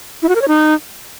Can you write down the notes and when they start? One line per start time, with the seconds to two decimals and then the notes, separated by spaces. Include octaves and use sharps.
0.23 E4
0.29 F#4
0.35 A#4
0.42 C#5
0.48 D#4